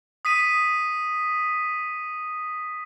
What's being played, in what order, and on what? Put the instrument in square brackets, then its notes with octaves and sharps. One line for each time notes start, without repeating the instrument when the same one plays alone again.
[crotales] D#6 B6 D#7